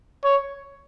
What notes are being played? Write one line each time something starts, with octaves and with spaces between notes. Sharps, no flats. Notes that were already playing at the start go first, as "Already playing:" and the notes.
C#5